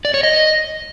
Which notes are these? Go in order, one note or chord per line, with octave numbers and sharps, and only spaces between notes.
D5
C#5
D#5